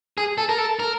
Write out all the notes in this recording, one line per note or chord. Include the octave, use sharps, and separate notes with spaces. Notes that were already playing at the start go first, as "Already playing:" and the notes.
G#4
A4
A#4
A4
A#4